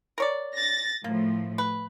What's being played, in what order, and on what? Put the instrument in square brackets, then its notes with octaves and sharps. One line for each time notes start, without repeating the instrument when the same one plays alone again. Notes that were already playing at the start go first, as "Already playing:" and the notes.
[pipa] A#4 C#5 D5
[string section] A6 A#6
[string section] A2 F3 [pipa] A#3
[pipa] B4